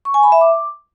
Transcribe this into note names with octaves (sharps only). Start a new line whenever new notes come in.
C#6
G#5
B5
E5
D6